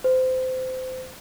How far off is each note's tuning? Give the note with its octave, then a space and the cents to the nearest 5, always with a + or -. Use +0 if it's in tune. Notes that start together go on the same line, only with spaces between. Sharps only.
C5 -25